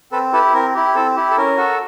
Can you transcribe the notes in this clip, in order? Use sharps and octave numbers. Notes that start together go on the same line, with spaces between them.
C4 A4 B4
E4 G4 A4 B4
C4 A#4
E4 G4
C4 A4
E4 G4
A4
C#4 A#4
F#4 A4